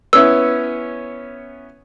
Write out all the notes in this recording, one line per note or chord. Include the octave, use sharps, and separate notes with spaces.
B3 C#4 E4 E6